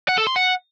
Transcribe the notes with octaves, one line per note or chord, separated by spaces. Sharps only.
F#5
A4
C6
F#5